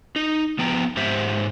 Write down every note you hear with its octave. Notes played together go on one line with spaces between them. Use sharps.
D#4
F3 B3 G5 A#5
G#2 G4 C5 E5